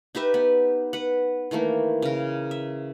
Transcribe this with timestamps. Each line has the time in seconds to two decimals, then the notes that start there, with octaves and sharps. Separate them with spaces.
0.15 D#4 G4 B4 E5
0.34 B3
0.93 B4 F#5
1.51 D#3 E3 A3 A#3
2.02 C#3 A#4
2.51 E5